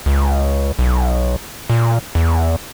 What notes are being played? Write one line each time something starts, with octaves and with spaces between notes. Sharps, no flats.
C#2
B1
A#2
E2